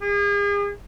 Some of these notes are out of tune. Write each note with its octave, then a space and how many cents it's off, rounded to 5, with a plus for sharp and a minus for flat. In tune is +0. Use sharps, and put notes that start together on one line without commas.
G#4 -40